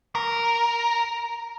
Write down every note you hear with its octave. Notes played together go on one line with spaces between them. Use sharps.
A#4